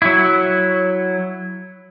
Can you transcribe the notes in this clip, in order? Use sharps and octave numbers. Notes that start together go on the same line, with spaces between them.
F#3 E4